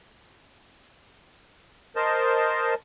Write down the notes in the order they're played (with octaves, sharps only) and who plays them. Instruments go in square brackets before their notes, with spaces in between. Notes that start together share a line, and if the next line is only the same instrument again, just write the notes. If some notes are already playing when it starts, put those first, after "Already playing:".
[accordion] A#4 C5 D#5 A5